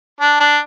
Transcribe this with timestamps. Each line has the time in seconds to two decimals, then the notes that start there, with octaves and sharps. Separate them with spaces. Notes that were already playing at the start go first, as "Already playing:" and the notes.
0.20 D4
0.40 D4